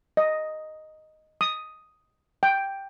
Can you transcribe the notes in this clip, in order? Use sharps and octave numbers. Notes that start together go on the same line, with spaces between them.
D#5
D#6
G5